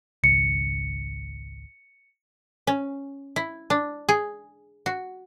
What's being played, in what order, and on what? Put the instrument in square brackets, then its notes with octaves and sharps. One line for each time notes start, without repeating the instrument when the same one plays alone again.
[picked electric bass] G#1 C#2 [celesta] C#7
[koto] C#4
E4
D4
G#4
F#4